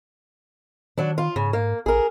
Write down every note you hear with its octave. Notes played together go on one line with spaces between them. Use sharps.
D#3 F#3 D4
F4
G#2 C#3
A#3
A1 G#4 A#4